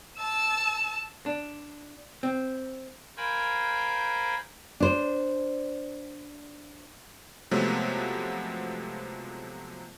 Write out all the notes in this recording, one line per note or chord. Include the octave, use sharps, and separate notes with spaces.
A5 E6
D4
C4
A#4 C5 F5 G5 G#5 B5
D4 C5
C3 F3 F#3 G#3 A3 B3